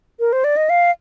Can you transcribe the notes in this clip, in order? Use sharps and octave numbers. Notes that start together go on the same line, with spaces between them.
A#4
C5
D5
D#5
F5